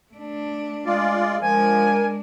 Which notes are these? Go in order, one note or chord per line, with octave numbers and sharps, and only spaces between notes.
A3 D4
G#3 F4 D5
F3 G#3 D4 A#4 G#5